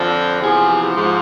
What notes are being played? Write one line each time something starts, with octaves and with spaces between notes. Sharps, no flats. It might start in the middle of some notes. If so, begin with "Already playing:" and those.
Already playing: F2 D3 F3
E2 C3 F3 G#4
G#2 F3